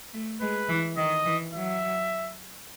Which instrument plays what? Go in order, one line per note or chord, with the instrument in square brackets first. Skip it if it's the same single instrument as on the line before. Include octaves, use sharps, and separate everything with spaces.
[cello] A3
[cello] G#3 [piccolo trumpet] B4
[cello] E3
[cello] D#3 [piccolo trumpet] D#5
[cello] E3
[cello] F#3 [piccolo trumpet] E5